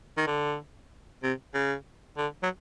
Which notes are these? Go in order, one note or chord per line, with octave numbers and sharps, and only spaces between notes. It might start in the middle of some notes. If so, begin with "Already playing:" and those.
D#3
D3
C3
C#3
D3
F#3